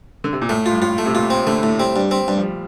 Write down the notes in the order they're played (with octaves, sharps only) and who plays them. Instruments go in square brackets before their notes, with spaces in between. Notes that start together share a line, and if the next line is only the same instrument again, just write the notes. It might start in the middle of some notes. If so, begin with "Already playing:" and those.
[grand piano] D3
C3
A#2
[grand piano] A2 [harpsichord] A3
[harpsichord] F4
[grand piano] G2
[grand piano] A2 [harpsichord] F4
[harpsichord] A3
[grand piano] C3
[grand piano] A#2 [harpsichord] F4
[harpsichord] C4
[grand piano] D3 [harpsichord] A3
[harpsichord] A2
[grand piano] G3 [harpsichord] C4
[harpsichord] G2
[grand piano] G3 [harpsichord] C4
[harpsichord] G2
[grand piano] F3
G3